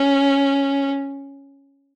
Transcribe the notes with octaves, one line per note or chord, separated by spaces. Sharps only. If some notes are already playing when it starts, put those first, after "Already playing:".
Already playing: C#4